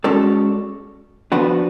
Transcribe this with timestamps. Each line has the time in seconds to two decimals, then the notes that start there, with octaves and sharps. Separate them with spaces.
0.04 G#3 C#4 F#4 A4 D5
1.32 F3 B3 D4 F#4 B4